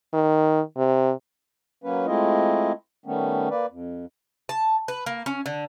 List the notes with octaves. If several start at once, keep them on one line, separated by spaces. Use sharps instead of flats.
D#3
C3
F#3 A#3 C#4 B4
G#3 A3 C4 E4 F4 D#5
D#3 G3 A3 B3 C#4
A#3 B4 D5
F2
A5
B4
A#3
C#4
D3